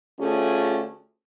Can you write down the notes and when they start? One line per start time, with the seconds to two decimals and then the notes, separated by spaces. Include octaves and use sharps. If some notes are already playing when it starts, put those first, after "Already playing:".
0.19 D2 A3 C#4 F4 G#4